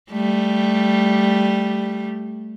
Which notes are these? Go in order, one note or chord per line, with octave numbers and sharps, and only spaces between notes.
G3 A3